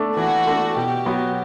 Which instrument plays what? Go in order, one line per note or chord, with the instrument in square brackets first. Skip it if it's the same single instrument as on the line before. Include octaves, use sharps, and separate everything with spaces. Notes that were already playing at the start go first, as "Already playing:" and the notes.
Already playing: [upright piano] A3 D4
[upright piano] E3 [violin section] F#4
[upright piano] A3 D4
[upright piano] B2 [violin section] G4
[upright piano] F#3 B3 F#4